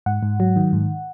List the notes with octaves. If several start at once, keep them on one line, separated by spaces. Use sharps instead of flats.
G#2 F#5
G#2
F#3
D#3
G#2